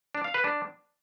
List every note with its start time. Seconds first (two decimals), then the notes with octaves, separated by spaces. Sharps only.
0.15 D4
0.24 F5
0.34 B4
0.44 D4